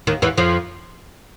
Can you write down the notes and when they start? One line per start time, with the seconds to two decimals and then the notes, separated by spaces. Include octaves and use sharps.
0.07 D#2 D#3
0.22 E2 E3
0.37 F2 F3